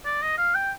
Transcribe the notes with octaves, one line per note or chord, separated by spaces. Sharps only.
D5
D#5
F5
G5